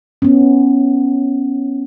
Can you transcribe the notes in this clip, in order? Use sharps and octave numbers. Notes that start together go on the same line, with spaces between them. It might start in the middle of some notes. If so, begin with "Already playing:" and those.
B3 C#4